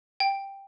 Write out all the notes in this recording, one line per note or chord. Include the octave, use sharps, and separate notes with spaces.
G5